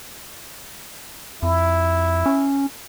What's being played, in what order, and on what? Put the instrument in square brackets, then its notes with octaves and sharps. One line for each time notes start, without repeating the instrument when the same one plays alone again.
[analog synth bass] F2 [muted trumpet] E4
[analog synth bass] C#4